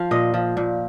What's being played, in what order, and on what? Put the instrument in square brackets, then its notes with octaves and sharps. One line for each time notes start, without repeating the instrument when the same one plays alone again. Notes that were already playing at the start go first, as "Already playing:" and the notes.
Already playing: [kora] F3 F5
A#2 D#5
F3
A#2